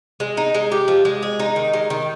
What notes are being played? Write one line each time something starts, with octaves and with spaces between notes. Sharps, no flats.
G#3
D#4
G#3
G4
F3
G#3
G#4
D#4
D#3
G#3
D#3